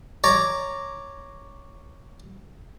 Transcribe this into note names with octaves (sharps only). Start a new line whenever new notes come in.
C#5 D5 A#5